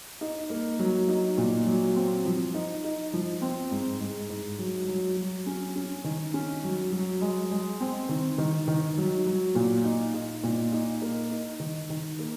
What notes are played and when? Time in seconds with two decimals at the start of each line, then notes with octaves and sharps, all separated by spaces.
0.21 D#4
0.50 A#3
0.79 F#3
1.08 D#4
1.38 A#2
1.67 F#3
1.96 C4
2.25 F3
2.54 D#4
2.84 D#4
3.13 F3
3.42 C4
3.71 G#2
4.00 G#2
4.30 G#2
4.59 F#3
4.88 F#3
5.17 F#3
5.47 C#4
5.76 C#4
6.04 D#3
6.34 C#4
6.64 F#3
6.92 F#3
7.21 G#3
7.51 G#3
7.80 C4
8.09 D#3
8.38 D#3
8.68 D#3
8.98 F#3
9.27 F#3
9.55 A#2
9.84 D#4
10.14 D#4
10.44 A#2
10.72 D#4
11.02 A#3
11.31 D#4
11.60 D#3
11.90 D#3
12.19 A#3